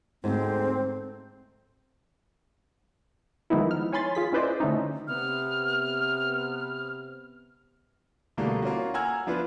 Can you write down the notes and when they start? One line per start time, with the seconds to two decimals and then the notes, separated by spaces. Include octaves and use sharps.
0.24 D2 G#2 C4
3.50 D#3 F3 G#3 B3 D#4 E4
3.71 F6
3.93 C#5 G#5 B5 C6 A6
4.15 F4 G#4 B6
4.33 C#4 E4 B4 C5 D5 D#5
4.60 D3 A3 C#4 D#4
5.08 C3 B3 F6
8.37 B2 D3 E3 G3 A3 A#3
8.62 A#3 C#4 F4 F#4
8.94 F#5 G#5 A#5 E6 F6 G#6
9.27 F3 B3 D4 E4 F4 B4